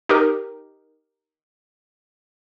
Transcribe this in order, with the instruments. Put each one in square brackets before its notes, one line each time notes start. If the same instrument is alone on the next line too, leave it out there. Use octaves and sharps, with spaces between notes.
[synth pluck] D#4 G4 A#4